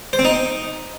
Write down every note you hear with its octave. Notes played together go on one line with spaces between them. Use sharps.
C5
C4
D#4